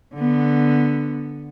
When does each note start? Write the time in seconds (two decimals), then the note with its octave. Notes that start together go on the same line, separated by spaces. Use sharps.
0.15 D3 B3